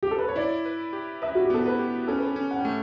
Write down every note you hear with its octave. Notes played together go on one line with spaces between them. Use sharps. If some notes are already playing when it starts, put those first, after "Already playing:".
G4
A4
B4
C#5
E4 D5
B4
G4
B4 E5
F#4
G4
B3 A4
B4
G4
C#4 A4
B4
A4
C#4
F#5
A3 G5